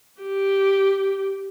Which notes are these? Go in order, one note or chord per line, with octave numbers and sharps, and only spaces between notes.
G4